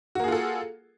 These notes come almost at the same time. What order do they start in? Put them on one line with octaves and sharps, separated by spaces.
F#4 A#3 G#4 F4 A4